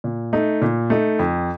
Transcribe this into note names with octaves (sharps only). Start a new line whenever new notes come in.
A#2
A3 D#4
A#2
A3 D#4
F2